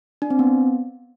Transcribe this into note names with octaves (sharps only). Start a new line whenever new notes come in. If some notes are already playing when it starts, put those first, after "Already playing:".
D4
C4
B3